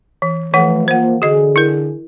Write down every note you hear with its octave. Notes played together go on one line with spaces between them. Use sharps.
E3
E3 F3 A3 B4 F#5
F3 A#3 C5 F#5
D3 F#4 G#4 D#5
E4 A#4